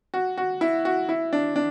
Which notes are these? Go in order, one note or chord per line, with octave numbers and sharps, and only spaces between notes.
F#4
F#4
E4
F#4
E4
D4
D4